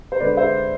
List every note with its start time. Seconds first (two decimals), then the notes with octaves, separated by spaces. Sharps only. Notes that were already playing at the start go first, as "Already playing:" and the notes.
0.12 C5
0.20 D3 G#3 D4 B4 D5
0.37 C5 E5